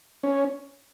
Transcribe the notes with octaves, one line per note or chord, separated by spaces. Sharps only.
C#4